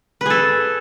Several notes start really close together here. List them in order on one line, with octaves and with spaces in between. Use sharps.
B4 G#4 A4